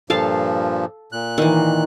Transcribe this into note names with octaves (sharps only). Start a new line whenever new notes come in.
G2 A#2 F3 A4 F5 A5
A#2 F#6
D#3 E3